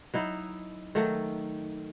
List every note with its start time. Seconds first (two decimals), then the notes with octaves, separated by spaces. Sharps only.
0.14 F#3 D#4 E4
0.95 D#3 F#3 A3